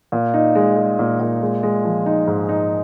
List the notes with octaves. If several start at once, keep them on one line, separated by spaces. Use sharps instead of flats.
A#2
D#4
G#3
G#3
A#2
A#2
G#3
G#3
F3
D#4
G#2
D#4